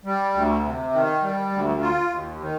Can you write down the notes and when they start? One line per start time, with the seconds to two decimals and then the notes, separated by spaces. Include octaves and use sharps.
0.05 G3
0.34 D2
0.64 C3
0.93 D#3
1.22 G3
1.51 D2
1.81 F4
2.10 D#2
2.40 D#3